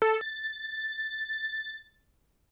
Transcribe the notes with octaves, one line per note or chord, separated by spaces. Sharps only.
A4
A6